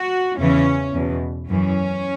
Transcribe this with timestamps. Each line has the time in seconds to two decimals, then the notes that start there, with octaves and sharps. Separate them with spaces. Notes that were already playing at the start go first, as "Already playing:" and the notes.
Already playing: F#4
0.38 E2 C#3 E3 C#4
0.94 E2 B2
1.49 F#2 E3 C#4